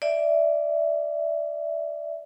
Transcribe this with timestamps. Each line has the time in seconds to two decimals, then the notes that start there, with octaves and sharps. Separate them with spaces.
0.02 D5 E5